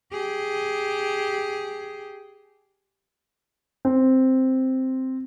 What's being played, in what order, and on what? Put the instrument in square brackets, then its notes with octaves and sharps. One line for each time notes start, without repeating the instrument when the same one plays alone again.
[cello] G4 G#4
[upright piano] C4